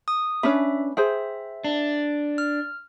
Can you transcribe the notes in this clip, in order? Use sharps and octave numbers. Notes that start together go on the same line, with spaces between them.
D#6
C#4 D4 B4 E5
G#4 C5 E5 G5
D4
F6